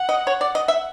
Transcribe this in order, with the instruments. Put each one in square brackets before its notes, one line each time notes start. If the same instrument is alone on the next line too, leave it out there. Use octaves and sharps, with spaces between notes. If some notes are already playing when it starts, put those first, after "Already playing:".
Already playing: [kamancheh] F#5
[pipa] D#5
C#5
D5
D#5
E5